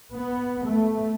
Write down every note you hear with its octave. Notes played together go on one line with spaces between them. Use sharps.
B3
A3